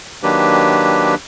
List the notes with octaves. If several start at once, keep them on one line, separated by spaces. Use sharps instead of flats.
D#3 F#3 A#3 D4 G4 B4